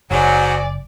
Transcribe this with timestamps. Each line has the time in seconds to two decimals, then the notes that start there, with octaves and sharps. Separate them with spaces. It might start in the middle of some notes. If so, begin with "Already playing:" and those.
0.11 F#1 G#2 F#3 D5 G#5